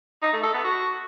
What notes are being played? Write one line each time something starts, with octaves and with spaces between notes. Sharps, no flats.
D#4
A3
A4
B3
F#4